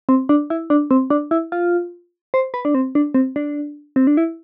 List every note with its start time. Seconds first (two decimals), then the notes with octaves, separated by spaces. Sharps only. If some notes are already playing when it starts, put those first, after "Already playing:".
0.09 C4
0.29 D4
0.50 E4
0.70 D4
0.91 C4
1.10 D4
1.31 E4
1.52 F4
2.34 C5
2.54 B4
2.65 D4
2.75 C4
2.95 D4
3.14 C4
3.36 D4
3.96 C4
4.07 D4
4.17 E4